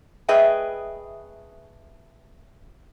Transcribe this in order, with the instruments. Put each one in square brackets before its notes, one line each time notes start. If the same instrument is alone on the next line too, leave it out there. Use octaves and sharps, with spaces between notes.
[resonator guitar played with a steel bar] A3 G#4 B4 D#5 E5 G5